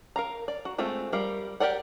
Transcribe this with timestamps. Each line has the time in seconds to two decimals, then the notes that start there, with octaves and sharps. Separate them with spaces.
0.16 A#4 F5 A#5
0.48 D5
0.65 F#4
0.78 G#3 A3 C4 F4
1.13 G3 A#4 F5
1.60 G4 A#4 D5 F#5